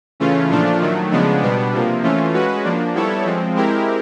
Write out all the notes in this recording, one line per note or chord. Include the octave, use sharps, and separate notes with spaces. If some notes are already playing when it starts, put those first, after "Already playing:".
C#3 E3 A3 C#4 F4
A#2 F3 A3 D4 F4
D#3 F#3 A3
C#3 F3 G#3 B3 D4
B2 G3 B3 D4
C3 F3 A#3
E3 A3 C#4 F4
G#3 C#4 F#4 B4
F3 A#3 D4
G3 B3 E4 A4 C#5
F3 G#3 C4
G#3 C4 E4 G4 A#4